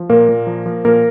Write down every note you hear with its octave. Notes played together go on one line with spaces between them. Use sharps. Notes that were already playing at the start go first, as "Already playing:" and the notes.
Already playing: F3
A#2 A#3 A#4
A#2
F3
F3
A#2 A#3 A#4